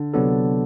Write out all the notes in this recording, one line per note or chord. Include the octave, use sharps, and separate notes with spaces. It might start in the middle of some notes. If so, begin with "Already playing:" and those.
Already playing: D3
C3 F#3 B3 D4 A4